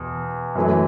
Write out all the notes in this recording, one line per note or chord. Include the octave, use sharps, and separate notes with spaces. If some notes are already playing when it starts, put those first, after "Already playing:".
Already playing: E2 B2
F#2 E3 A3